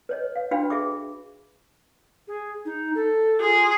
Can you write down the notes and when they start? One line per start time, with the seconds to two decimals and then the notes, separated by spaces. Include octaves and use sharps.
0.09 B4 C#5 D#5
0.36 F5
0.51 D4 F#4 B4 F5 G5 B5
0.70 G#4 E5 D6
2.28 G#4
2.65 D#4
2.95 A4
3.41 F4 G#4